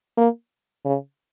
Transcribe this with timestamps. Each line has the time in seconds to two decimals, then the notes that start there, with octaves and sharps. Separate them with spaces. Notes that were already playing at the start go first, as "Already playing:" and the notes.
0.17 A#3
0.85 C#3